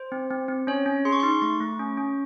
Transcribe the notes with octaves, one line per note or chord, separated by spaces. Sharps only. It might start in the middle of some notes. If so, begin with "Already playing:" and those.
Already playing: C5
C4
C4
C4
C#4 C#5
C#4
G#4 C6
C#6
D#4 C6
A3 C#6
A3
C#4
C#4